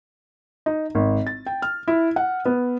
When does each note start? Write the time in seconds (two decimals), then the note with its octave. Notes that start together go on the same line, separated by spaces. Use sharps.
0.66 D#4
0.95 G#1
1.27 A6
1.46 G5
1.62 F6
1.88 E4
2.16 F#5
2.45 B3